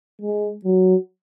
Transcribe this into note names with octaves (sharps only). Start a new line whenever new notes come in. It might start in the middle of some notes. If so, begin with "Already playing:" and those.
G#3
F#3